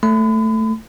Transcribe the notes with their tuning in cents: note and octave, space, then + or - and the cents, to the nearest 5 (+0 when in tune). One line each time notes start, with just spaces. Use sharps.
A3 +5 B5 +35